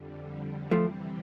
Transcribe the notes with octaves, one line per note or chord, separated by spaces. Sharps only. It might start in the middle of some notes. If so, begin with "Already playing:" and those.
Already playing: F2 D3 G3
C3 E3 F3 G3 A3 C4